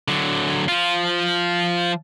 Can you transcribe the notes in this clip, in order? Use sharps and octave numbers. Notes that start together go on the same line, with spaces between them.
D3 F#3
F3 F4